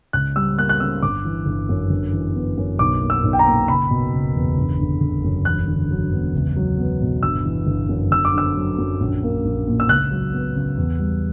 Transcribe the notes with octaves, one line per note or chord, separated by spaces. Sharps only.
C#2 F#6
G3 E6
A#3 F#6
F#6
C#3 E6
G1 D6
E3
G1
F#2
G1
E3
B3
F#2
B1 D6
A#3
E6
B1
G5
A#5
A#2
F#1 B5
B2
F#1
E2
G1
D3
G1
F#2
E1 F#6
D3
F#3
E2
C#2
F#3
B3
B2
G1 E6
E3
G1
F#2
G1 E6
D6
D3 E6
F#3
F#2
A#1
A#3
A#1
A#2
E6
C#2 F#6
F#3
B3
C#3
E2
G3